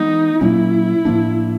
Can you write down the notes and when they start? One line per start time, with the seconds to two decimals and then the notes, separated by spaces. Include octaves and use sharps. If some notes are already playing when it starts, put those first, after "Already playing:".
Already playing: E3 G#3 B3 D#4
0.41 A#2 F#3 A#3 C#4 E4
1.05 A2 F3 A#3 D4